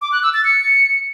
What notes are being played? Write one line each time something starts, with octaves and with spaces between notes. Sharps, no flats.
D6
F#6
E6
A6
C#7